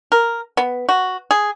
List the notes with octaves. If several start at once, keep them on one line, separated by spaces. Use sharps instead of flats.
A#4
B3
F#4
G#4